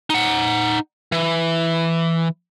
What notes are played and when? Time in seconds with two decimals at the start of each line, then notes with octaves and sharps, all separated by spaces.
0.10 D#4 F#5
1.12 E3